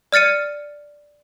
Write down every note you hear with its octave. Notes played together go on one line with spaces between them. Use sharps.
D5 F6 A6 C#7 D#7